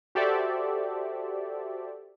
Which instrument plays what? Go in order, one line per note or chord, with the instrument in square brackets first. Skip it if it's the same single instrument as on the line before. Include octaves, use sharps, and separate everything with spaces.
[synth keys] F#4 G4 A4 C5 D5 E5